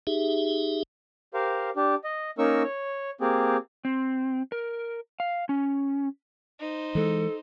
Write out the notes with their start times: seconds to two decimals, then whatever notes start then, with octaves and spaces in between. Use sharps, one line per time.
0.07 D#4 G4 G#4 E5
1.34 G4 A#4 C5 F5
1.76 D4 G4
2.04 D#5
2.38 A#3 C#4 D#4 A#4 C#6 E6
2.63 C#5
3.21 A#3 C4 G4 G#4
3.85 C4
4.52 A#4
5.20 F5
5.49 C#4
6.59 D#4 C5
6.95 E3 G#3 A4